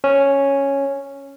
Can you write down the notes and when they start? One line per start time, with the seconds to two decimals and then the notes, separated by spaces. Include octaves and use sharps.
0.04 C#4